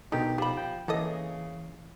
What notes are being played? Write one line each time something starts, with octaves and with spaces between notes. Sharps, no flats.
B2 D3 D#3 D#4 G4
F3 G4 B5
G5
C#3 E3 A#3 A4 D#5